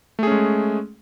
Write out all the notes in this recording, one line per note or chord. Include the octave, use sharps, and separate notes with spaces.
G#3 A3 C#4 G#4